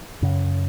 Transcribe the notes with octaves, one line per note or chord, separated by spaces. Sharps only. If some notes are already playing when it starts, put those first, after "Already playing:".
F#2 C#3